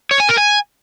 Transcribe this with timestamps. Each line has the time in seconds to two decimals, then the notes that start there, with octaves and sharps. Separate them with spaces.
0.11 C#5
0.20 G#5
0.29 A#4
0.38 G#5